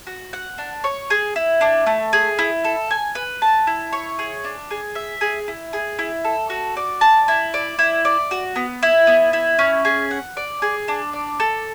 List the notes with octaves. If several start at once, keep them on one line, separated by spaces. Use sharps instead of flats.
F#4
F#5
D4
C#5
G#4
E4
D4
A3
G#4
E4
A4
G#5
B4
A5
E4
C#5
G#4
D4
G#4
E5
G#4
E4
G#4
E4
A4
F#4
D5
A5
E4
D5
E4
D5
F#4
B3
E4
B3
E4
C#4
G#4
F#5
D5
G#4
D4
D5
A4